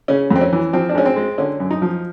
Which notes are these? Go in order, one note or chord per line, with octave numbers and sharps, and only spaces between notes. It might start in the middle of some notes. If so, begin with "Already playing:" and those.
C#3 C#4
F2
C4
C#4
E3
F3 C4
D4
G#2 C#4
C4
G#3
D3 C#4
F#2
D#4
F3